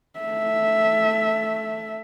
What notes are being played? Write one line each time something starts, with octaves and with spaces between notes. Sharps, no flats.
A3 E5